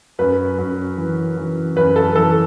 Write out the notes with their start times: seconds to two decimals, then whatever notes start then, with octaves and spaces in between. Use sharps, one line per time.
0.19 F#2 B4
0.58 F#2
0.98 E3
1.37 E3
1.76 F#2 B4
1.96 A4
2.16 E3 A4